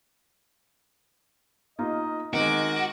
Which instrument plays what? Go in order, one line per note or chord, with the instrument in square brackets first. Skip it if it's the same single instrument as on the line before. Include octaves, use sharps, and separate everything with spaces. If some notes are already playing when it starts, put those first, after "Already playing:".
[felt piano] A#3 D#4 F4 [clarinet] D#5
[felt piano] D#3 C4 D#4 [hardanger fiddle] G#3 D6 [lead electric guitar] F#4 [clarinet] A#4